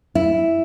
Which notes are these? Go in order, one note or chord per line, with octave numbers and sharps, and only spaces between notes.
E4